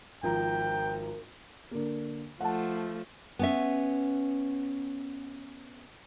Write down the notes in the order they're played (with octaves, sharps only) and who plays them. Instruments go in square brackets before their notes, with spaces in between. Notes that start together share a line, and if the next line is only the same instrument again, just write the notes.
[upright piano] G#1 F3 A#5 [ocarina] A#4 [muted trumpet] G5
[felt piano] D3 A#3
[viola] F3 A3 [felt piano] F#5 A5
[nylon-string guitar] B3 C#4 E5